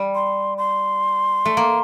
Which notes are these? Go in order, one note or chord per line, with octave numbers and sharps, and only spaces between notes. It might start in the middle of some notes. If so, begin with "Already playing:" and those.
Already playing: G3
C6
C6
A3
A#3